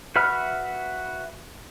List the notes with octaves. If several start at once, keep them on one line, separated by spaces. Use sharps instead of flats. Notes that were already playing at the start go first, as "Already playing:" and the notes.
F#4 B4 E5 B5 F6